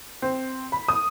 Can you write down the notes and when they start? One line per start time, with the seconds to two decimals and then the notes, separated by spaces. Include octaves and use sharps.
0.22 C4
0.72 B5
0.88 D#6